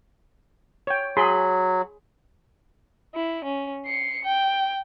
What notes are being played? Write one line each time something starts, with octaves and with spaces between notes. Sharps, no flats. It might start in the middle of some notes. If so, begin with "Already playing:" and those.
C#5 G5
F#3 G#4 B5 C6
E4
C#4
C7 C#7
G5